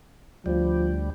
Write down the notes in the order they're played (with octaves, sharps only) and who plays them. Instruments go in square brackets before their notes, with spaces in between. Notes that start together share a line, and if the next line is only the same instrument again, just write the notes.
[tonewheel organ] D2 G3 [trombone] F3